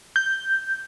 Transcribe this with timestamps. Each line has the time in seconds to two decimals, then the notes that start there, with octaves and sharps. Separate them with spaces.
0.16 G6